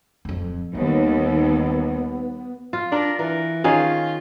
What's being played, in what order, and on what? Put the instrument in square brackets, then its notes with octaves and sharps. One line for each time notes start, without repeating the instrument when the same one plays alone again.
[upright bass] D1 F2
[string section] D#2 [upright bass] G3 [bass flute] B3
[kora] F4
[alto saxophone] D4 [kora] A#4
[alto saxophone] E3 [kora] A#4
[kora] D#3 C#4 G#4 [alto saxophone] F4